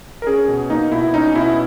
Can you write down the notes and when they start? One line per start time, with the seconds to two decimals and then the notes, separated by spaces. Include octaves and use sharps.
0.22 A#4
0.27 C#4 G#4
0.48 B2
0.70 A#3 D#4
0.92 B2 E4
1.14 C#4 D#4
1.35 B2 E4